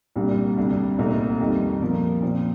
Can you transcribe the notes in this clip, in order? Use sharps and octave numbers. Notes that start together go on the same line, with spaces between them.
C2 A#2 G3 D4
D2 C3 G3 D4
C2 A#2 A3 C4 D#4
F2 D#3 G3
A#2 F3 A#3
A#2 F3 C4